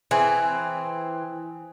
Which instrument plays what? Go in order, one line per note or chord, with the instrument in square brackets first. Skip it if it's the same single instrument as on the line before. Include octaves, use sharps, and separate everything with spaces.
[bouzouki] E3 C4 [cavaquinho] G#4